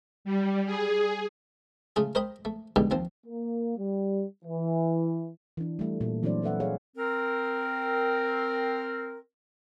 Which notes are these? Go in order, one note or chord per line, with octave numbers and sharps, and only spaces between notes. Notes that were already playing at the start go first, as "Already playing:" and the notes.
G3
G#4
C#3 A3 F4 G#4
A#4 C5 D#5 G5 B5
A3
G2 B2 D3 D#3 G3 G#3
D#2 F3 C4
A#3
G3
E3
E3 D4
G3 A3
A#2
E3 F#3 C4 D4 C5 D5
E4 A4 B4 E5 F#5
G#4 C#5 F5
C4 A#4